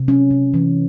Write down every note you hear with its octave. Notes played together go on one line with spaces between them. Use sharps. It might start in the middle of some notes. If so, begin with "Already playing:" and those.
Already playing: C3
F#3 C#4
C3
E3